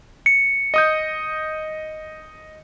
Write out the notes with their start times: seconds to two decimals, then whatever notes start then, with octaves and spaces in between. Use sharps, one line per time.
0.26 C#7
0.74 D#5 D#6 G6